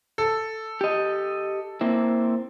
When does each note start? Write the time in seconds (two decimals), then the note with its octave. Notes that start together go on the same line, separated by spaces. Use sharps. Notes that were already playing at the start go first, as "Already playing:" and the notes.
0.18 A4
0.81 G4 D#5
1.81 A#3 C4 E4